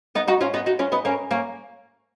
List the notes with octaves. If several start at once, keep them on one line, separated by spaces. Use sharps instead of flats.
B3 D#4
D#4 F#4
C#4 F4
B3 D#4
D#4 F#4
C#4 F4
B3 D#4
A#3 C#4
A#3 C#4